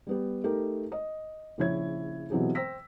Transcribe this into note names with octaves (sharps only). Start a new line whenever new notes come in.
G3 B3 G4
A3 D#4 G4 A#4
D#5
A#1 C#3 E4 C#5 G#6
B2 E3 F#3 C4 G4 G#4
C5 G5 E6 A#6 B6